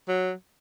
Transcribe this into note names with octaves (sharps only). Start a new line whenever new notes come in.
F#3